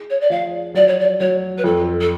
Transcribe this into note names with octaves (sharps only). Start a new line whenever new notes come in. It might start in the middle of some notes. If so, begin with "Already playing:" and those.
Already playing: G#4
C#5
D5
F3 F5
F#3 D5
C#5
D5
F#3 C#5
B4
F2 A4
A4